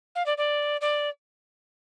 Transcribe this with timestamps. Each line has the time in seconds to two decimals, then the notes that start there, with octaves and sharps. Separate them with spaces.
0.15 F5
0.26 D5
0.37 D5
0.81 D5